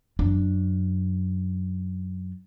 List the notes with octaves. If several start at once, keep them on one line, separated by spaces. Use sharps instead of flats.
F#2 D4